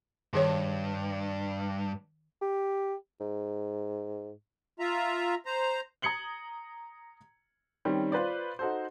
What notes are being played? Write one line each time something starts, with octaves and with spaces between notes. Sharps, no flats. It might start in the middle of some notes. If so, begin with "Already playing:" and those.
G2 D#3 G#4 C#5
G4
G#2
F4 E5 A#5
C5 A#5
A#5 D#6 G#6 C#7 F#7 G7
D#3 G3 C4 C#4
F4 B4 C5 D5
D#4 F#4 A4 C5